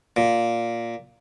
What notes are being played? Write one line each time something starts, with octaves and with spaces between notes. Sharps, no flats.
A#2